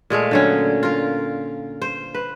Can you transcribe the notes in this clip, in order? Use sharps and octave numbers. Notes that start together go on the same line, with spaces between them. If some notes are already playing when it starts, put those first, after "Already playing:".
A#2 G#3 A3 F5
D3 F#3 C#4
F4 A#4
C5
B4